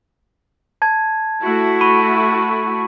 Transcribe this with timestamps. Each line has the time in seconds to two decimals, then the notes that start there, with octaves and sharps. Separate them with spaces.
0.82 A5 G#6
1.41 A3 E4 F#4
1.81 B5 C#6 D#7